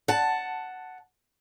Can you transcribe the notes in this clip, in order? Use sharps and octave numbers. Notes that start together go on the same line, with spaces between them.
F#5 A5